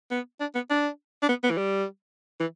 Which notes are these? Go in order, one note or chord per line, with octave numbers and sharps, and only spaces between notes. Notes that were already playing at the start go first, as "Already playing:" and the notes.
B3
D4
B3
D4
D4
B3
B3
E3
G3
E3